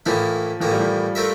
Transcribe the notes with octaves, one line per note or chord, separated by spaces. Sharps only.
A2 E3 F3 A#3 E4
A2 E3 F3 A#3
G3
F3
A3 C4 F4 A#4 E5